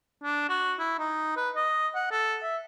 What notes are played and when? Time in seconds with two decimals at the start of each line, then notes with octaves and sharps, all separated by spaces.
0.24 D4
0.49 F#4
0.79 E4
0.99 D#4
1.37 B4
1.56 D#5
1.95 F#5
2.11 A4
2.43 E5